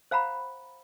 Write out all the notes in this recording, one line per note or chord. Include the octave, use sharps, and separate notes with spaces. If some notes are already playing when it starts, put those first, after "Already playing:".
C5 F5 F#5 A#5 B5